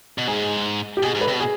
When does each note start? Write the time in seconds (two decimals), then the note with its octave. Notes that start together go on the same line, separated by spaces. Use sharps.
0.18 B2
0.27 G#2 G#4
0.97 G4
1.03 B2 G#4
1.15 G#2
1.21 B4
1.28 C3
1.34 B2
1.40 G#4